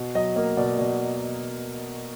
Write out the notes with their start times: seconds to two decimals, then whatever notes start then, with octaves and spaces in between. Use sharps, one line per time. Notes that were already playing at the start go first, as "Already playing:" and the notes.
Already playing: B2
0.15 F#3 D#5
0.36 A#3 D#5
0.57 B2 D5
0.79 B2 D5